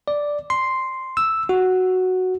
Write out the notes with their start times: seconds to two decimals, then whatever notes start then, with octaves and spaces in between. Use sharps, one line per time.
0.08 D5
0.50 C6
1.17 E6
1.49 F#4